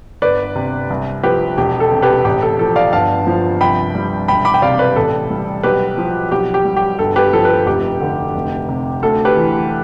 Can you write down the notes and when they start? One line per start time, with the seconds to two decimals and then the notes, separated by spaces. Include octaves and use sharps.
0.22 G1 B4 D5
0.55 C3
0.90 C2
1.23 F3 G4 B4
1.57 E1 G4
1.80 A4
1.91 C3
2.02 G4 B4
2.25 A1 G4
2.42 A4
2.59 F3 A4
2.76 D5 F5
2.93 G1 F5 A5
3.27 F3
3.61 C2 G5 B5
3.95 G3
4.28 E1 G5 B5
4.45 B5 D6
4.54 G5
4.62 C3 D5 F5
4.79 B4 D5
4.96 A1 A4
5.30 G3
5.63 B1 G4 B4
5.97 F3
6.32 B1 G4
6.54 G4
6.65 G3
6.77 G4
6.99 G1 A4
7.16 G4 B4
7.33 F3 A4
7.45 B4
7.50 A4
7.67 F1 G4
8.01 D3
8.35 F1
8.69 C3
9.02 D2 A4
9.25 G4 B4
9.37 E3